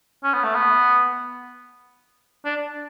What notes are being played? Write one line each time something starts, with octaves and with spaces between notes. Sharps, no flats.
C#4
B3
A3
B3
D4